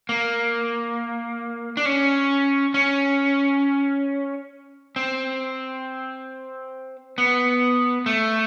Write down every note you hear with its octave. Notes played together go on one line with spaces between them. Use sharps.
A#3
D4
C#4
C#4
C4
B3
A3